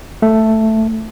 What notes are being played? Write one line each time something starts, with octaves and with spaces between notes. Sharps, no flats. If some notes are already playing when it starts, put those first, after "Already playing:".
A3